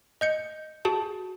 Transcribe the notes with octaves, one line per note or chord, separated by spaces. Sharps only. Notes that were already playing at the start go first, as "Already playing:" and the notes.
D#5 G6 C#7
F#4 G#4 A5